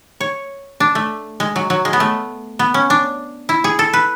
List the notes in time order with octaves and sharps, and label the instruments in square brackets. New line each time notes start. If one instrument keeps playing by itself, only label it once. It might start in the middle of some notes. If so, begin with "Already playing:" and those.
[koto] C#5
D4
A3
G#3
F#3
F#3
G#3
B3
A3
B3
C#4
D4
E4
G#4
A4
B4